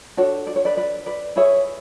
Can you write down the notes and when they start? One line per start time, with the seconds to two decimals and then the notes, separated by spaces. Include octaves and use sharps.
0.17 D4 F#4 A4 C#5
0.47 D5
0.56 C#5
0.65 B4 D5
0.77 B4 D5
1.06 B4 D5
1.36 E4 G#4 B4 C#5 E5